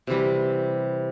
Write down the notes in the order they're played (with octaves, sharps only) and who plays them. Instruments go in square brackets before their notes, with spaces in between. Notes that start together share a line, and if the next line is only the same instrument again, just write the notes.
[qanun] C3 E3 G3